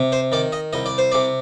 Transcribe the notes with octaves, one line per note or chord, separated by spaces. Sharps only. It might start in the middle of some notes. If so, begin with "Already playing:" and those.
Already playing: C3
C5
D#3 D5
D#5
C2 D#5
D5
C5
C3 D5